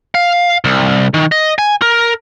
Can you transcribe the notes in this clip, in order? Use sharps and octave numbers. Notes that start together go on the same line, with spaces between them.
F5
C2
D#3
D#5
G#5
A#4